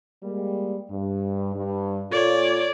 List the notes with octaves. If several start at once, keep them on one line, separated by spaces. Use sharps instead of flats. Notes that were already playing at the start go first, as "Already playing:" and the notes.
G3 G#3 A#3
G2
G2
A#2 F4 A4 C#5 D5